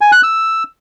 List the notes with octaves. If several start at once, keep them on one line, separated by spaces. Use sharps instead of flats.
G#5
F#6
E6